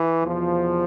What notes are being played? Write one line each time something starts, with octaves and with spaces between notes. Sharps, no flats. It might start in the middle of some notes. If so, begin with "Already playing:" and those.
Already playing: E3
E2 B2 F3